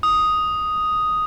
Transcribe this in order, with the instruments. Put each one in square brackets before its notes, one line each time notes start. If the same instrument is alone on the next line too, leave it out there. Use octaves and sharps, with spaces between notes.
[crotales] D#6